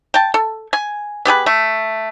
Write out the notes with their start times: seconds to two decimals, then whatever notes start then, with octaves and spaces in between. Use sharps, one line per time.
0.14 G5 A5
0.34 A4
0.73 G#5
1.25 B3 G4 G#4 B4
1.46 A3